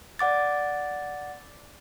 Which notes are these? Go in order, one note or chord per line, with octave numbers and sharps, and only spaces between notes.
D5 F#5 D6 A6